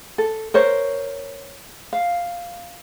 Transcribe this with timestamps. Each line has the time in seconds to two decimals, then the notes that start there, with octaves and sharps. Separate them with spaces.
0.18 A4
0.54 A#4 C5 C#5
1.93 F5